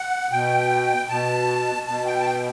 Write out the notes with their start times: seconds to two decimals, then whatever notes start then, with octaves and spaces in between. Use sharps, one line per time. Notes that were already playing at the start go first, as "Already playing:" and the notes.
Already playing: F#5
0.31 B2 G5
1.09 B2 A5
1.86 B2 A5
2.06 G5
2.21 A5
2.26 G5